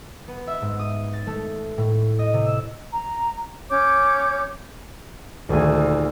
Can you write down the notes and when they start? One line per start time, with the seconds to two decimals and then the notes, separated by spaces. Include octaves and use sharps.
0.28 B3
0.47 E5
0.62 G#2
0.79 D#6
1.13 A6
1.27 A3
1.78 A2
2.19 D#5
2.33 C3
2.45 E6
2.93 A#5
3.70 C#4 C#5 D6 G6
5.49 D#1 D2 G#4